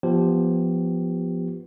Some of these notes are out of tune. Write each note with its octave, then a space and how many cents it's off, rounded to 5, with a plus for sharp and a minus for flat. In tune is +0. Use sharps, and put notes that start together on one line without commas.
F3 +0 B3 +0 G4 +0